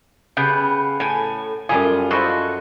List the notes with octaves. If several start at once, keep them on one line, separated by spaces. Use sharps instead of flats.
C#3 B3 G4 G5
A2 G#5
F#2 G3 F4 G#4 A4
F3 E4 F#4 A4 C5 D#5